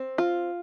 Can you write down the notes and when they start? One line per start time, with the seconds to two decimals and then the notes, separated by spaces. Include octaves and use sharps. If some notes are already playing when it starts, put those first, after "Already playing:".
Already playing: C4
0.18 F4